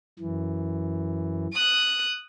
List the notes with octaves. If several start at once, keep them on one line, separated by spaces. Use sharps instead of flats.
F#2 E3
D#6 F#6